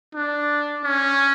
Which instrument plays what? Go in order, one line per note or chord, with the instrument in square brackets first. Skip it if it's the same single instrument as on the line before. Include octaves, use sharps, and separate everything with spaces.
[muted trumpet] D4
C#4